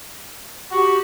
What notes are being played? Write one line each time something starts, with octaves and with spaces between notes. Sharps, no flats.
F#4 G4